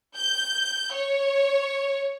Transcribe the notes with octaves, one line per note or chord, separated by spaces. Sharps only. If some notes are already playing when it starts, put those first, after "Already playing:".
G6
C#5